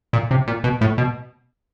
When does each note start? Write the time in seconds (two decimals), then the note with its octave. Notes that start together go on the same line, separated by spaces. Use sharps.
0.13 A#2
0.31 C3
0.48 A#2
0.64 B2
0.81 A2
0.98 B2